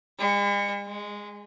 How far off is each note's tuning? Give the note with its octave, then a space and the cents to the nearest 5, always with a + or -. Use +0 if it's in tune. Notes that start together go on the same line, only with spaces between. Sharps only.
G#3 -45
G#3 -10